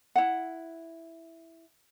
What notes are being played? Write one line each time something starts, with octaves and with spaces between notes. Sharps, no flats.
E4 F#5